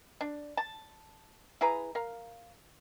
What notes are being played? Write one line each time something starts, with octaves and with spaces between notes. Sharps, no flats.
D4
A5
E4 G#4 B4 A#5
A#4 F5